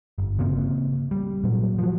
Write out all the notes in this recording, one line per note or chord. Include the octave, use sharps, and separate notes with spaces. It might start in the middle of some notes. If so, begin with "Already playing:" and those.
G1
C#3 A#3 C4
G3
A#2 F#3
F3 F#3